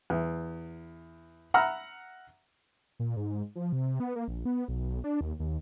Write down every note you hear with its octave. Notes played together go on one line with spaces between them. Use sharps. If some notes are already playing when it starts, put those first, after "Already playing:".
E2
E5 F#5 A#5 B5 E6 F6
A#2
G#2
F3
C3
B3
A#3
A#1
B3
B1
D4
D#2
D#2